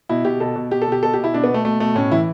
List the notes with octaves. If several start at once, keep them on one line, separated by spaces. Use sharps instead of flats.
B2 E4
B2 G4
B2 A4
B2
B2 G4
A4
B2
G4
B2 A4
G4
B2
E4
B2 D4
B3
B2
A3
B2 A3
B2 A3
A2 C#4
E3 E4